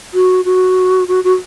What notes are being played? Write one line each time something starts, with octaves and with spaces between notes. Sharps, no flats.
F#4
F#4
F#4
F#4